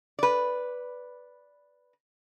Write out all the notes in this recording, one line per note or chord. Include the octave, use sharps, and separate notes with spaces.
B4 D5